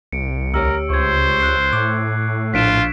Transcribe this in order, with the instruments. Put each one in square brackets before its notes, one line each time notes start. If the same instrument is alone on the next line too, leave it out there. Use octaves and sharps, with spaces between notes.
[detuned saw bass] C2 [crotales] C#7 D7
[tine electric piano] D2 G4 C#5 [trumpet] A#4 [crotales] E6
[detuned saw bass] C#2 [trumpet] C5 [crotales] C#6 G#6
[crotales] F#6 C7
[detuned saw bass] A2 [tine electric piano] D6
[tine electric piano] A#1 D4 [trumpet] F4 [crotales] B6 D7 E7